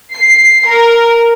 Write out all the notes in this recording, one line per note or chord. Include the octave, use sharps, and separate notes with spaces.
C7
A#4